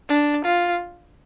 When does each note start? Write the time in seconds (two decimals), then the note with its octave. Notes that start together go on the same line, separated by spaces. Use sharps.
0.09 D4
0.45 F4